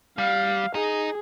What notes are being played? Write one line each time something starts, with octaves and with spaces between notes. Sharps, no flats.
G3 F5
D#4 G#4